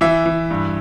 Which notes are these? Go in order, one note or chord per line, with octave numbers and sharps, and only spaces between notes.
E3 E5
E3
G2